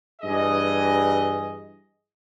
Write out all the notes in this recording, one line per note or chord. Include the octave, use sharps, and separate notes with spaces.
G2 E3 G#4 D#5